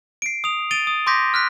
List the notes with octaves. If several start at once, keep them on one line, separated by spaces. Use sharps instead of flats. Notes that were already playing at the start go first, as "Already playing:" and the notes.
C7 D7
D#6 F7
A6 D7 D#7 F7 G7
D#6
C6 D6 D#6 G6 A#6 B6
F6 F#6 B6